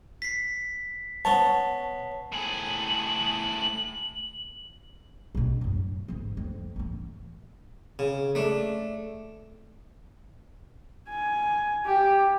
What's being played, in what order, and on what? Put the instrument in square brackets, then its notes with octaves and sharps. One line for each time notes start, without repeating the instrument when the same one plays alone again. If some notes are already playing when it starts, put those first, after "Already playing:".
[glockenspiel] B6 C7
[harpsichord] B3 C#4 C#5 [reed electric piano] A5
[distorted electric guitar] A2 G#4 [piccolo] F#7
[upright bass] A#1 B2
F#2 A2
G#1 D2
F2
A2 E3
[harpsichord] C#3
A3 D4
[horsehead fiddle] G#5
G4